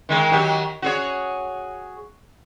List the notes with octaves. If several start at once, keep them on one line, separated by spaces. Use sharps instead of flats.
D#3 G#3 A#3
D#3 F#3 G4
F#4 G#4 C#5